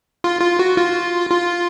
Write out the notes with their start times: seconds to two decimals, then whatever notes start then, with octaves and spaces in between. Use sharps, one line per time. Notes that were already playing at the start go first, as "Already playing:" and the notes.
0.24 F4
0.41 F4
0.59 F#4
0.77 F4
1.31 F4